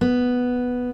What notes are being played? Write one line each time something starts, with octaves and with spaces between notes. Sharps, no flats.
B3